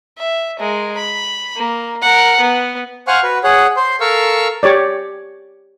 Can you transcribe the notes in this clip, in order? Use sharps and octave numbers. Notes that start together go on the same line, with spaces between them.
E5
G#3 A#4
B5
A#3
A#4 F#5
B3
C5 F5 F#5 G#5 C#6 F6
F#4 B4
G#4 C#5 F#5
C5 C6
A4 A#4 F5 C#6 E6
G4 C#5 D5